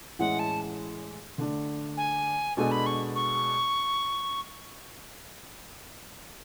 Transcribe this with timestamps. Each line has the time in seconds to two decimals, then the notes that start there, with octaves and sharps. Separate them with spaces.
0.19 A2 E3 G#3 C#4 E4 F#5
0.39 A5
1.38 D3 A3 D4
1.97 G#5
2.57 B2 G#3 D4 A4 G#5
2.71 B5
2.86 C#6
3.16 C#6